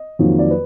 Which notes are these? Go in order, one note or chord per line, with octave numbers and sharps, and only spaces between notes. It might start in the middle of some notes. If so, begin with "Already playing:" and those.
Already playing: D#5
F2 D#3 F#3 A#3
D5
B4